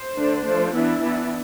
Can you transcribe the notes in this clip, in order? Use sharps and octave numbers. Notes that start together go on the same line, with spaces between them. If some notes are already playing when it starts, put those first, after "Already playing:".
Already playing: C5
D3 A3 D4
F3 A3 D4 C5
E3 B3 D4 E4
E3 B3 D4